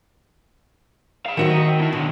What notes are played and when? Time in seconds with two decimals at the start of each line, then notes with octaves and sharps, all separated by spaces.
1.26 F5 B5
1.37 D#3 A3 D#4 F#4 E5
1.52 D#4 D#5
1.64 C4
1.80 E4 A5
1.93 B2 D3 D#3